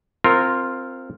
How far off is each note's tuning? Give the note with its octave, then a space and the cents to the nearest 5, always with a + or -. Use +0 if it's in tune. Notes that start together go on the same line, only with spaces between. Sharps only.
C4 +0 F4 +0 A#4 -20